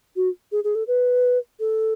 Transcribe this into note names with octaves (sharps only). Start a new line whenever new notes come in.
F#4
G#4
G#4
A4
B4
A4